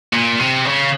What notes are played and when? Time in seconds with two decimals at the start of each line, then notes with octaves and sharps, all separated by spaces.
0.13 A#2
0.39 C3
0.65 C#3